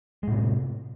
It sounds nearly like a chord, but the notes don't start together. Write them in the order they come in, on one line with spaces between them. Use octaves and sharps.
G#3 A2 C3